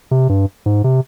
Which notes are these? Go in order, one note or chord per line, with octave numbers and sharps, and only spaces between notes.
C3
G2
G#2
C3